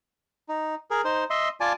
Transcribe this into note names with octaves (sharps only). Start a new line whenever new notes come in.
D#4
G#4 A#4
D#4 C5
D#5 E5 C6
F4 D5 G#5 A5